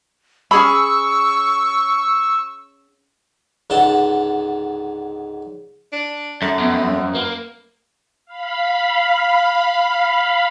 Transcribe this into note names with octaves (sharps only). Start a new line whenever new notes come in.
C#4 G#4 B5 C#6 E6
C#2 G#2 D3 F#5 A5 C6
D4
F#2 A3
F2 B3
A#3 B4
F5 B5